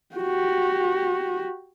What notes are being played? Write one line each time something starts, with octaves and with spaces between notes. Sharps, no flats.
F#4 G4